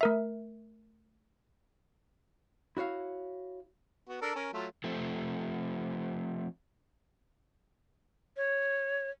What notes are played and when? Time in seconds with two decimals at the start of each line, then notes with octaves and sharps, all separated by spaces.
0.01 A3 A#4 E5
2.77 E4 F#4 C#5 F5
4.09 B3 F#4
4.21 D4 A4 A#4
4.35 C#4 A#4
4.53 F#3 A3 F4
4.84 F3 A3 C4
8.37 C#5